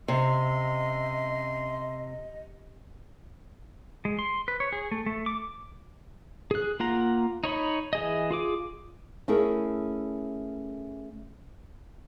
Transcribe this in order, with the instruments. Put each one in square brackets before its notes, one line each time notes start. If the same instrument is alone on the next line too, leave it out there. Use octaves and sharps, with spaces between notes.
[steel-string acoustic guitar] C3 [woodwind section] C#4 E5 C6 [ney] D#5
[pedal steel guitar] G#3
C6
B4
C#5
G#4
A3
A3
D6
G#4 F#6
A#3 F4 F#5 A#5
D#4 C#5 B5
E3 G#4 D#5
F4 G#4 D6
[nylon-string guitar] A3 C#4 E4 G#4 A#4 E5